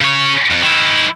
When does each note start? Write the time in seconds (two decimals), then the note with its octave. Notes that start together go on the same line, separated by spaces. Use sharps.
0.01 C#3 C#5
0.52 F2
0.64 D#3 E4